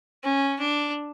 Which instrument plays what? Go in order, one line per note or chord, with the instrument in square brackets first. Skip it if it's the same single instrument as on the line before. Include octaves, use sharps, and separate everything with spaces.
[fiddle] C#4
D4